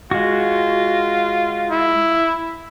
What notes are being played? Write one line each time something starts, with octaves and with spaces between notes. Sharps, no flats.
G#3 F4 F#4
E4